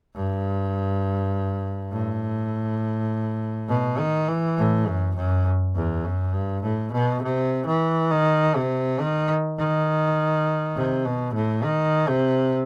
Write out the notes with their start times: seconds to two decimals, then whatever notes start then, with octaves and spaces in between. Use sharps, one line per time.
0.16 G2
1.93 A2
3.69 B2
3.98 D#3
4.28 E3
4.58 A2
4.87 F#2
5.16 F#2
5.75 E2
6.05 F#2
6.35 G2
6.63 A2
6.92 B2
7.22 C3
7.66 E3
8.11 D#3
8.56 C3
9.00 D#3
9.58 D#3
10.76 C3
11.06 B2
11.34 A2
11.64 D#3
12.08 C3